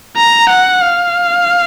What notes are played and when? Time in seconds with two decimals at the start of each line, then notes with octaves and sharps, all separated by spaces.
0.16 A#5
0.50 F#5
0.82 F5